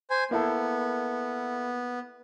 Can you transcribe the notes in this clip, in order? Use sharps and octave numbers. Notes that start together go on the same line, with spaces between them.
C5 G#5
A#3 B3 E4 A4